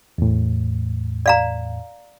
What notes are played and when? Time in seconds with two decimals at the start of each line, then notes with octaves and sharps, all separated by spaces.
0.18 E2 A2
1.26 D5 F5 A#5